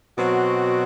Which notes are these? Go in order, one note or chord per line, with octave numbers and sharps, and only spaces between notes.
B2 F#3 C4 F#4